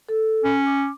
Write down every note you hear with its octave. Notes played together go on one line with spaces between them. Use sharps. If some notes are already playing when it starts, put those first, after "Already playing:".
A4
C#4
D6